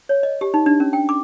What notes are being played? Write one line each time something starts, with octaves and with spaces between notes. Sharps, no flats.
C#5
D#5
G4
D#4
D4
C#4
G5
D6